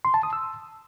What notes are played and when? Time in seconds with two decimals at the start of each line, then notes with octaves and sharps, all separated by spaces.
0.05 C6
0.14 A5
0.23 D#6
0.33 E6